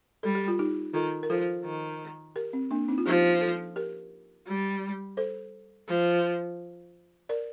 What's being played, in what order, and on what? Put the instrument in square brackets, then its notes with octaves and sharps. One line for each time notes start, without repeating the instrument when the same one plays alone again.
[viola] G3 [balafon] A4
[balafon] G4
F4
D#4 G4
[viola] D#3 [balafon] F4 A4
[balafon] A#4
[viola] F3 [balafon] F4 A4
[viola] D#3
[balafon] G4 A#4
C4
A#3 D4
C4 D#4
F4
[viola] F3 [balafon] D#4 G4
[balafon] F4 A4
G4 A#4
[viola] G3
[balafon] A4 C5
[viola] F3
[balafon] A#4 D5